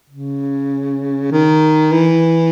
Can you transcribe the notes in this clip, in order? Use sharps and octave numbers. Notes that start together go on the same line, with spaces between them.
C#3
D#3
E3